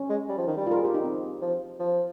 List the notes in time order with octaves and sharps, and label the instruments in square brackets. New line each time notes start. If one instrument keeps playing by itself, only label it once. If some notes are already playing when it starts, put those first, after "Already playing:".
Already playing: [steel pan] C#4
[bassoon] G#3
G3
F3
D#3
G3
[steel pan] F4
A#4
G#4
G4
D#4
C4
[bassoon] F3
F3